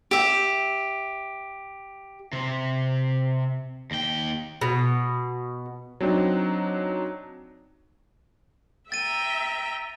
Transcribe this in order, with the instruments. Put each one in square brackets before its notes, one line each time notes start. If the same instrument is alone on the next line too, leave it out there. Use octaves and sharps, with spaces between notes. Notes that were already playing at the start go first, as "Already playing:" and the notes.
[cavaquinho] G4 E5
[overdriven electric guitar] C3
D#2 G5
[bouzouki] B2
[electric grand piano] F#3 C4 D4 D#4
[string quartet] E5 G5 A#5 [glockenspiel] A6 D#7